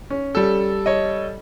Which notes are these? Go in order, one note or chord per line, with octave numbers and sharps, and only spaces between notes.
C#4
G3 A4
C#5 D#5